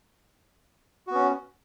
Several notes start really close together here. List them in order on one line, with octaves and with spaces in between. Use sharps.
F#4 B3 C#4